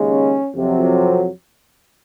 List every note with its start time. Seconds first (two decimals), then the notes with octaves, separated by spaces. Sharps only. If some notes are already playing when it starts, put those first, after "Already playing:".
Already playing: D#2 C#3 G#3
0.09 C#4
0.55 F2 C3 F#3